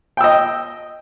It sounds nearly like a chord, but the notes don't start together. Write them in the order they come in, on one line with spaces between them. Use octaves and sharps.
G5 E6 D#5